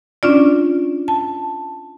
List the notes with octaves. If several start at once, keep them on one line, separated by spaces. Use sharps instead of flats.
C#4 D4 F4 D5
A5